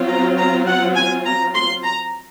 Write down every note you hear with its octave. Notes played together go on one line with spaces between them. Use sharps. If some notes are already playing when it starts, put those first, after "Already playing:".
Already playing: F#3 C4 F4
A#5
A#5
F#5
G#5
A#5
C6
A#5